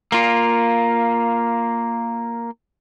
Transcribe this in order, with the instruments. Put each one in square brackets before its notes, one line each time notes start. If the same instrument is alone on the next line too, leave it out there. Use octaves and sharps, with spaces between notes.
[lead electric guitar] A#3 F4